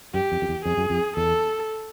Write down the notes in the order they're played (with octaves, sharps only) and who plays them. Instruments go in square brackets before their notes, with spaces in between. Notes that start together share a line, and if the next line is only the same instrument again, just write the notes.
[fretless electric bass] F#2 [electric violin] G4
[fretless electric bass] F2
F2
E2
[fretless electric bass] F2 [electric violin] G#4
[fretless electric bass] F#2
F2
[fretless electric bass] E2 [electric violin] A4